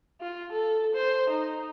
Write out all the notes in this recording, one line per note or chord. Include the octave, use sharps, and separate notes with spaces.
F4
A4
C5
D#4